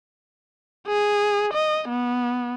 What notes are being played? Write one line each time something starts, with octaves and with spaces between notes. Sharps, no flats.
G#4
D#5
B3